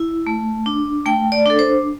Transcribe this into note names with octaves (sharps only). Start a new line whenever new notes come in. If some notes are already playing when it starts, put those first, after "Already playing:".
Already playing: E4
A3
D4
A3 G5
D5
D4 A4
C5